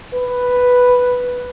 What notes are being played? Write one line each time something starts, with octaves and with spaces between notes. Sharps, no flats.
B4